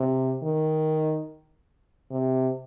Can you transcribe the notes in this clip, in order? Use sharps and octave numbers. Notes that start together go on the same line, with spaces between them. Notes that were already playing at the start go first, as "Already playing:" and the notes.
Already playing: C3
D#3
C3